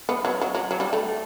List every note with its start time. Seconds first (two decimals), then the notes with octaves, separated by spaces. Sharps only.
0.09 B3
0.25 F#3
0.41 F#3
0.55 F#3
0.71 F#3
0.80 G3
0.93 A3